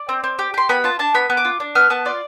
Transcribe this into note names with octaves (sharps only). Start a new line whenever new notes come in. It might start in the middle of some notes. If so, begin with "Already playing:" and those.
Already playing: D5
C4
C4
G4
G4 C6
B3 B5
F4 A5
D4 A5
B3 B5
B3
D6
F4
D4
B3 F6
B3 A5
F4 D5